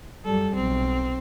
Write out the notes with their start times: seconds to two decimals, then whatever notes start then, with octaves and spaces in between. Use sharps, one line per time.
0.25 F#2 G3 A4
0.55 B1 C4